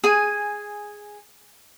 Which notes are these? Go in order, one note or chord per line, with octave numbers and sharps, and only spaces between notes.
G#4 G#5